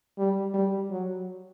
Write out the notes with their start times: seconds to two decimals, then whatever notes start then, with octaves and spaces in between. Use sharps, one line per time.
0.18 G3
0.54 G3
0.90 F#3